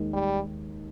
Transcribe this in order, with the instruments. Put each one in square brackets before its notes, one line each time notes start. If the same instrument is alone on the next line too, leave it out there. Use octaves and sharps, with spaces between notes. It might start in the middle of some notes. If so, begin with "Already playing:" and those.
Already playing: [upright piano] D#2 D#3 G#3
[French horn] G3